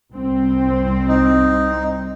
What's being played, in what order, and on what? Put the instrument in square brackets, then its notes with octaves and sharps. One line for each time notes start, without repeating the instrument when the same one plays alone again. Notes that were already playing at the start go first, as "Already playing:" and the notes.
[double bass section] C2 G3 C4
[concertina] D#4